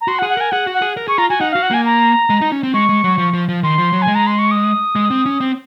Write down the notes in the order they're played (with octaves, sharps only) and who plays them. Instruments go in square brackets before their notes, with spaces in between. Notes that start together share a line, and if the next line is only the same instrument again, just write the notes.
[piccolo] A#5
[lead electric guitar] F#4 [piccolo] C6
[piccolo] F#5
[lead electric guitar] G#4
[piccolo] F#5
[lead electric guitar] A#4 [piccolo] G#5
[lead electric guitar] G#4 [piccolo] F#5
[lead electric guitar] F#4
[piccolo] F#5
[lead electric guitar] G#4
A#4
[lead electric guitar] G#4 [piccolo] C#6
[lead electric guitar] F4 [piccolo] A#5
[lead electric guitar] F#4 [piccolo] G#5
[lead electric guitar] D#4 [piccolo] F#5
[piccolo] F5
[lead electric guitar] F#4
[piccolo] F#5
[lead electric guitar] A#3 [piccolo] G#5
[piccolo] A#5
[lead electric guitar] G#3
D#4
C#4
C4
[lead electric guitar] G#3 [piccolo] C#6
[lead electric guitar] G#3
F#3
F3
F3
F3
[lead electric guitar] D#3 [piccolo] C6
[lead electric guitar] F3
F#3
[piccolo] G#5
[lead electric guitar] G#3
[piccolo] A#5
C6
C#6
D#6
[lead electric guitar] G#3
C4
C#4
C4